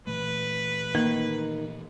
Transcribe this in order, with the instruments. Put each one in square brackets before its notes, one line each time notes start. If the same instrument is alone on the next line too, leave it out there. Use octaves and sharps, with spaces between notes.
[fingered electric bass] A#2 E3 A3 [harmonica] B4
[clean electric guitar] D#3 [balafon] A#3